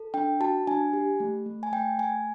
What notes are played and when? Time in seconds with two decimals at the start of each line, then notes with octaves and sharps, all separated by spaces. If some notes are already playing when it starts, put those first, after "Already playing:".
Already playing: A4
0.14 D4 G5
0.40 F#4 A5
0.67 D4 G#5
0.93 G4
1.20 A3
1.46 A3
1.63 G#5
1.72 A3 G5
1.98 A3 G#5